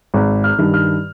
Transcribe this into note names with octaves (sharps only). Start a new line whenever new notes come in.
G#1
F6
G2 D#3
F6